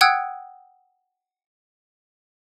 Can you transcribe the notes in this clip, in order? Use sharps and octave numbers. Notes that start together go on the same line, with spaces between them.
F#5 G5 D#6 E6 F#6 G#6